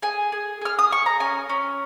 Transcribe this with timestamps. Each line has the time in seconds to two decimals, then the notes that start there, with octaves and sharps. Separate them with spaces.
0.02 G#4 G#5
0.32 G#4
0.61 G#4 F6
0.79 D#6
0.91 G#4 C#6
1.06 A#5
1.20 C#4 G#5
1.49 C#4